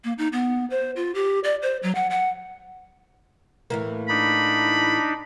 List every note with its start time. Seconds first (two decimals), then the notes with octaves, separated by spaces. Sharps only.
0.04 A#3
0.18 D#4
0.33 B3
0.70 C5
0.96 F4
1.15 G4
1.44 D5
1.62 C5
1.83 F#3
1.95 F#5
2.10 F#5
3.70 A2 E3 A#3
4.09 D4 D#4 B5